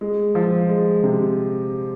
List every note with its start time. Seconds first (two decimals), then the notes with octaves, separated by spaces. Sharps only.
0.01 G#3
0.35 F3
0.69 G#3
1.03 C3